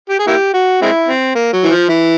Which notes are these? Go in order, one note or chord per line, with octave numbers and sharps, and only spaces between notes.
G4
G#4
A#3 E4 G4
F#4
G#3 C4 E4
C4
A#3
F#3
E3
F3
E3